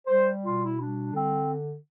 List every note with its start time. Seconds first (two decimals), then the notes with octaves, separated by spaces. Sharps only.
0.07 G3 C5
0.43 B2 F4
0.61 E4
0.78 G3 D4
1.13 D3 C4